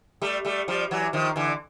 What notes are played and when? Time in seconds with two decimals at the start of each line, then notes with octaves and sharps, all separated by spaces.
0.22 G3 A3
0.45 G3 A3
0.68 F3 G3
0.91 E3 F#3
1.13 D#3 F3
1.36 D3 E3